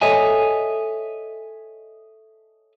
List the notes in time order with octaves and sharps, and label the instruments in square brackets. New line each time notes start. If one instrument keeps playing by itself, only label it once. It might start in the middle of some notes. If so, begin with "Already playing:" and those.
[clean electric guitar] A4 C#5 D#5 E5 G#5